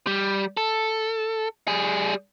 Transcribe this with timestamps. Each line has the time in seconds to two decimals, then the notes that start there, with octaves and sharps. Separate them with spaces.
0.07 G3
0.57 A4
1.68 G3 G#4